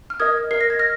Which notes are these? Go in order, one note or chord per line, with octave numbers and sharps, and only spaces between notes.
F6
A#4 D#5 D#6 G#6
A#4 D#5 C7
A#6
G#6
F6 A#6